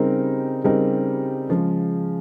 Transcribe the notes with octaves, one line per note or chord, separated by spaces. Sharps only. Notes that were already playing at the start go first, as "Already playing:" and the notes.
Already playing: C#3 G3 C4 D#4 A#4
C#3 G3 C4 D#4 A#4
C#3 F3 G#3